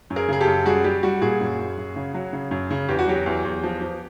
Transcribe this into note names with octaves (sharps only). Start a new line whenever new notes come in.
F#2
G#4 A#4
C#3 G#4
G4 A4
F#2
G3 F#4 G#4
G3 G4
G3 F#4
A#2 F#4 G#4
F#2
F#2
F#2
C#3
F#3
C#3
F#2
C#3
E2 G4
F#4
F#3 G4
E2
E2
F3
F3